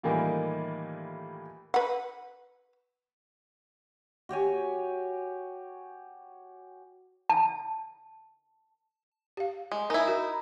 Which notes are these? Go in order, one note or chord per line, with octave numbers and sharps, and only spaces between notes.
A2 D#3 E3 G3 A#3 F4
B4 F#5
F#4 G4 C#5 G#5
A5
G4 F5
G#3
D#4 E4 A#4 G#5
F#4 A#4